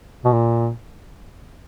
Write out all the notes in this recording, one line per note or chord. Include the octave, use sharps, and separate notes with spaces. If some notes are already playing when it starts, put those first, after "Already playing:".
B2
A#2